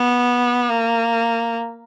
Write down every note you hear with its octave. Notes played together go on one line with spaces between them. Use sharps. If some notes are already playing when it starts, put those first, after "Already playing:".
Already playing: B3
A#3